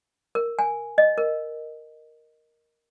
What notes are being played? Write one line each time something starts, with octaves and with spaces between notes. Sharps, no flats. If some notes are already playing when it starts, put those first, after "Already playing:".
A#4
G#5
D#5
A#4